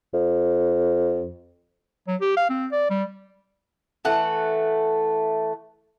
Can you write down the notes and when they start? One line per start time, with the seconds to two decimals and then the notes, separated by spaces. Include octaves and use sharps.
0.14 F2
2.07 F#3
2.21 G4
2.37 F5
2.49 C4
2.72 D5
2.90 G3
4.05 E3 A3 F#5